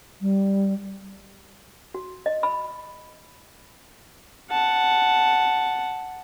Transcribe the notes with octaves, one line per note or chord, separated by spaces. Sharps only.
G3
F#4
D#5
B5
F#5 A5